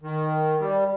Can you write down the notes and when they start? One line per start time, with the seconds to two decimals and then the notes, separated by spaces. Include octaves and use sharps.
0.01 D#3
0.60 G3